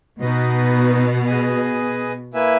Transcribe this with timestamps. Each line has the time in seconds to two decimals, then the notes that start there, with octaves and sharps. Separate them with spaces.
0.20 B2 B3 D#4 F#4 B4 D#5
1.27 G#4 B4 D#5 G#5
2.34 A#3 E4 B4 E5 G#5